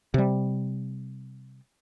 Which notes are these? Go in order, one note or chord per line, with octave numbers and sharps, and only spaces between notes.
C3 G3